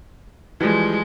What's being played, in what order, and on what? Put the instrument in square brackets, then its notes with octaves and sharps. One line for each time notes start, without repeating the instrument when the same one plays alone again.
[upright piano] E3 F3 G3 [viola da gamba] G#3